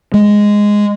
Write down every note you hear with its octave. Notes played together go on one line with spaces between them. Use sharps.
G#3